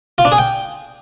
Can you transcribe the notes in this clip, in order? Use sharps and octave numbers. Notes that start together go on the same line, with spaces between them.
F4
D4
G#4
G5